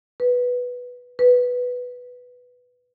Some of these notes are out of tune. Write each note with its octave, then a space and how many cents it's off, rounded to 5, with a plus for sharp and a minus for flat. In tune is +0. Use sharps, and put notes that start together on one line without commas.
B4 -5
B4 +0